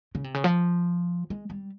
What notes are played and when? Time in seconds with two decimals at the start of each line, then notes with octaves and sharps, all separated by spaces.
0.15 C#3
0.24 C3
0.34 C#3
0.44 F3
1.30 G#3
1.50 G3